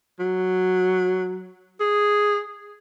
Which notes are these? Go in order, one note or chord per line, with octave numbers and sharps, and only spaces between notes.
F#3
G#4